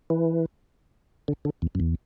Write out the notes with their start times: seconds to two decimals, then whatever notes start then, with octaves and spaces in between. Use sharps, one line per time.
0.10 E3
1.28 D3
1.45 D3
1.62 E2
1.75 F#2
1.80 E2